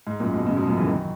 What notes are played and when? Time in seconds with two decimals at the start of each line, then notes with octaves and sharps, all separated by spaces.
0.07 G#2
0.20 F#2 A#2
0.33 G#2 B2
0.46 A#2 C#3
0.57 G#2 B2
0.67 F#2 A#2
0.77 C#3 E3
0.87 D#3 F#3